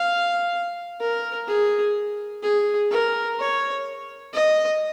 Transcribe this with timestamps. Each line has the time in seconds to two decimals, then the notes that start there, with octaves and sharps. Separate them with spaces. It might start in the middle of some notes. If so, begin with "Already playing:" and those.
Already playing: F5
1.00 A#4
1.48 G#4
2.43 G#4
2.91 A#4
3.39 C#5
4.34 D#5